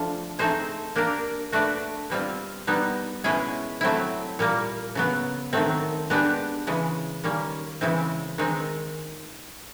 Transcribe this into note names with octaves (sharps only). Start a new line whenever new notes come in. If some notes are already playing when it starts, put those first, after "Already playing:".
Already playing: F3 A3 D4 F4
A3 C4 D#4 G#4 C5
A#3 D4 G4 A#4
A3 D4 F#4 B4 D5
B2 G3 C4 F4
B2 G3 B3 D#4
B2 G#3 C#4 E4 G#4
F#3 A3 C4 E4
A#2 G3 A#3
C#3 F#3 B3
D#3 F#3 A3 C4
G#3 B3 D4 G4 B4
C#3 E3 G#3
D#3 G3 A#3 C#4
C#3 E3 G#3 C4 E4
D#3 G#3 C4 D#4